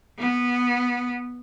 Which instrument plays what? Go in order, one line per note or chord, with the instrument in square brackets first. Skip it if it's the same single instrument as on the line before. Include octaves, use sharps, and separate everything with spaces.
[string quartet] B3